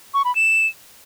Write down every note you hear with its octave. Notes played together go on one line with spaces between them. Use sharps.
C#6
B5
E7